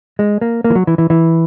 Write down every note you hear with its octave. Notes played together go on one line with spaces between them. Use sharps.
G#3
A#3
A#3
E3
F#3
E3
E3
E3